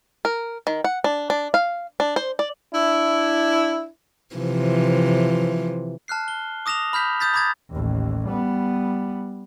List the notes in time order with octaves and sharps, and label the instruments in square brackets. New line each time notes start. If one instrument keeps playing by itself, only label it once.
[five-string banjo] A#4
D#3
F#5
D4
D4
F5
D4
C5
D5
[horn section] D4 E4
[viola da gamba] C3 E3 F3
[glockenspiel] A5 F6 F#6 C7
G7
D6 D#6 A#6 E7 F7
B5 F6 G6 B6
D#6 G6 A6 B6
A#5 B5 D6 D#6 G#6 A6
[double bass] A1 D#2
G3 B3